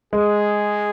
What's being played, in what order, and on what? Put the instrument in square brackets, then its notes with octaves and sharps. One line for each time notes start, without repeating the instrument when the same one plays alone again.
[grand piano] G#3 [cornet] G#4